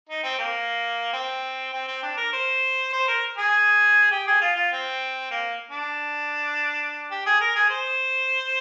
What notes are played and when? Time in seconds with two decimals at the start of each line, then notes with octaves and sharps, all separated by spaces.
0.09 D#4
0.23 C4
0.38 A#3
1.13 C4
1.73 C4
1.88 C4
2.02 D4
2.17 A#4
2.33 C5
2.93 C5
3.08 A#4
3.37 G#4
4.11 G4
4.27 G#4
4.41 F4
4.56 F4
4.72 C4
5.31 A#3
5.71 D4
7.11 G4
7.26 G#4
7.41 A#4
7.55 G#4
7.70 C5